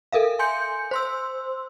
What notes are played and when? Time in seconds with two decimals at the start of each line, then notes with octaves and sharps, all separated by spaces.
0.12 A4 A#4 E5 F5
0.39 G#5 C6 G6 C#7
0.91 C5 C6 E6